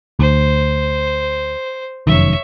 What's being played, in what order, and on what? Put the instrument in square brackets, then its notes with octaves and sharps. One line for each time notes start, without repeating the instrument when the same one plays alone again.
[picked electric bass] D2 [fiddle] C5
[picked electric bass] F1 F#2 D#3 [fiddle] C#5 E5